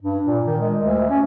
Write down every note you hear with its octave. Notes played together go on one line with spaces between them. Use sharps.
G2
A#2
D#3
G#3
D2
C#4